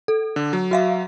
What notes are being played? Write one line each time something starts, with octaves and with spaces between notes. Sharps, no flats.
A4
D3
F#3
F#4 E5 F5